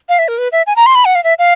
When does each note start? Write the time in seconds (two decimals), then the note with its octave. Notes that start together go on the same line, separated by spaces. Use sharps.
0.09 F5
0.19 E5
0.28 A#4
0.38 B4
0.52 E5
0.67 G#5
0.76 A#5
0.86 C6
0.95 B5
1.05 F#5
1.15 F5
1.24 E5
1.39 F5